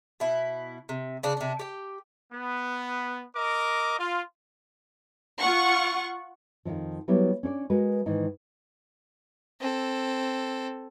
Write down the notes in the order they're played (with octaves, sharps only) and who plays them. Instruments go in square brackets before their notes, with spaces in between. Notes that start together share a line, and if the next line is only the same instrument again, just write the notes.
[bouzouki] B2 E4
C3
C#3 D4
C3 D4
G4 G5
[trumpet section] B3
A#4 D#5 D6
F4
[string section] F4 F#5 C#6
[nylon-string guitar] F2 G#2 D#3 F3
F#3 G3 B3 E4 G4 B4
C#4 D4 C#5 D5
G#3 F#4 A#4 B4
G#2 D#3 E3
[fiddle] C4 A4